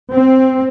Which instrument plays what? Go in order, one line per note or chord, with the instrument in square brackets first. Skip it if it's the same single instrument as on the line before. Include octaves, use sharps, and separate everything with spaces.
[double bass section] C4